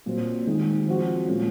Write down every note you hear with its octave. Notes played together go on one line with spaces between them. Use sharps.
A#2 F#3 C4
D#3 G#3 D#4 F#4
F3 C4 F#4
A#2 G#3 C#4 F4